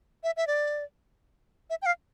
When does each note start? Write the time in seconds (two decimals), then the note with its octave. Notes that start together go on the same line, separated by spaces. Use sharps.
0.24 E5
0.37 E5
0.47 D5
1.70 E5
1.82 G5
1.86 F5